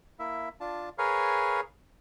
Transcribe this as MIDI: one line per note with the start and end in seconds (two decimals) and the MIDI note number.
0.19 0.49 58
0.19 0.49 64
0.19 0.49 76
0.60 0.89 62
0.60 0.89 65
0.60 0.89 81
0.98 1.60 68
0.98 1.60 70
0.98 1.60 71
0.98 1.60 73
0.98 1.60 77